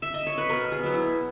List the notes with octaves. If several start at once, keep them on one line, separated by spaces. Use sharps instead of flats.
E5
D#5
C#5
B4
B2 A#4
G#4
F#3 B3
E4